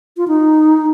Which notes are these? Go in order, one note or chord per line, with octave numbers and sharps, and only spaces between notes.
F4
D#4